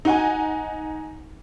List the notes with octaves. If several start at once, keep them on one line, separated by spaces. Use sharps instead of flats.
D#4 F#5 G#5